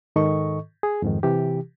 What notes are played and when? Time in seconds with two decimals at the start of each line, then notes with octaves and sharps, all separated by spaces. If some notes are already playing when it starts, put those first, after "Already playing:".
0.16 G#2 D#3 A4 D#5 C#6
0.83 G#4
1.02 F2 G#2 D#3
1.23 C3 E3 G4